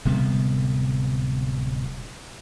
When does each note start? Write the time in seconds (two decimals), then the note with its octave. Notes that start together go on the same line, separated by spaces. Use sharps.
0.05 D1 C3 G3 B3